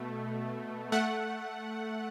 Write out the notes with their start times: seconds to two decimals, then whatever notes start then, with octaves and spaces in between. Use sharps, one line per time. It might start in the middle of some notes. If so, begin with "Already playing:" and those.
Already playing: B2 A3
0.92 A3 F#5